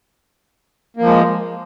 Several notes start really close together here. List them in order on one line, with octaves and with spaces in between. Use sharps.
A#3 F3 G#3